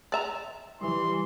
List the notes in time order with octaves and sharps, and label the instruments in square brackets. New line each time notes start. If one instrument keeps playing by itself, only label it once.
[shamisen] D5 E5 A#5
[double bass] E3 [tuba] G3 [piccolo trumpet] C6